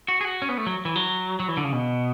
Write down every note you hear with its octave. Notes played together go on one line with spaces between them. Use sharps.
F#4
G#4
F#4
C#4
B3
A3
F#3
E3
F#3
F#3
E3
D3
C#3
B2